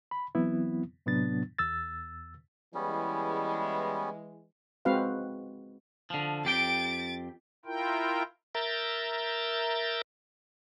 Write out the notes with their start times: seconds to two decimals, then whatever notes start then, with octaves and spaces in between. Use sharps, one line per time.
0.11 B5
0.35 E3 F#3 B3 C4 E4
1.06 A2 C3 F#3 B3 D4 A6
1.59 E2 E6 A6
2.75 E3 G3 G#3 B3 C#4
4.85 G#3 C4 F#4 B4 F5 F#5
6.10 D3 F3
6.45 F2 G4 G5 A6 D7
7.65 E4 F4 A#4 G5
8.55 A#4 E5 A#5 G6 A6